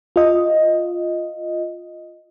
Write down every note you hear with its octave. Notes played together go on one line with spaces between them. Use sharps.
F4 D#5